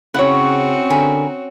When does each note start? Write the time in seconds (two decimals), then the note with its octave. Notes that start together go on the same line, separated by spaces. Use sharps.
0.14 C#3 C4 C#4 E4 F#4 C#5 F#5
0.90 D3 G#4 A#4 B5